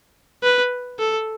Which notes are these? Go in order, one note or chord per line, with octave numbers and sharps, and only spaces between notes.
B4
A4